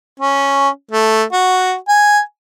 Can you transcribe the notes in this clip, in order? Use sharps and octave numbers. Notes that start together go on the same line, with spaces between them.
C#4
A3
F#4
G#5